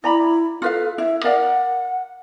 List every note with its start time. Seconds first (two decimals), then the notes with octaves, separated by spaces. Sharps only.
0.04 E4 D5 A#5 B5
0.62 F4 A4 B4 F5
0.98 E4 E5
1.24 A#4 D5 F5 F#5